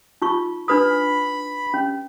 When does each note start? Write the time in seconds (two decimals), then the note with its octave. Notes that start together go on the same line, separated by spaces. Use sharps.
0.22 D#4 F4 C#6
0.68 D4 B4 B5 D#6
1.74 C#4